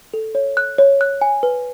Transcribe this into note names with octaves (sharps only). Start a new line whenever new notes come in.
A4
C#5
F#6
C#5
F#6
G#5
B4